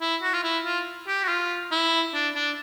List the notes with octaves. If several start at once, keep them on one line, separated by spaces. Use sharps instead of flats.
E4
F#4
F4
E4
F4
G4
F#4
F4
E4
D4
D4